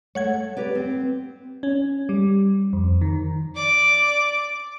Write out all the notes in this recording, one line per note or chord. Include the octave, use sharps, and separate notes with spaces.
A3 C#5 F#5 G#6
G4 B4 D5
C4
C#4
G3
F2
D#3
D5 D6